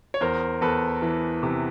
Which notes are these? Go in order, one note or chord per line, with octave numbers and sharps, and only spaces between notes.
C#5
E2 A#4 C5
E2 A4 B4
E3
C3